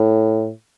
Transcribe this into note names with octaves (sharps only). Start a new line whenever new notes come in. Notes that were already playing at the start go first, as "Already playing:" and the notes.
Already playing: A2